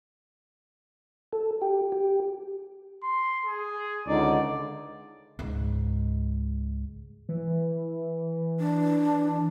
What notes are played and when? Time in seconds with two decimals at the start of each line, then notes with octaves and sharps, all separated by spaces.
1.33 A4
1.62 G4
1.92 G4
3.03 C6
3.46 G#4
4.07 C#2 D3 D#4 D5
5.39 C#2 G#2
7.29 E3
8.60 D4